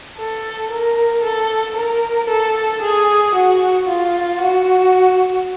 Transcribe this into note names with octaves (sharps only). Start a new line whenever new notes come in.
A4
A#4
A4
A#4
A4
G#4
F#4
F4
F#4